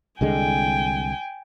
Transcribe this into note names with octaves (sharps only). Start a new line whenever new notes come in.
C2 D3 G#3 G5 G#5